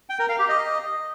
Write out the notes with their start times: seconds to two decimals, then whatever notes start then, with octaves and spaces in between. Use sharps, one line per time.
0.09 G5
0.19 A#4
0.29 F5
0.39 G4
0.49 D#5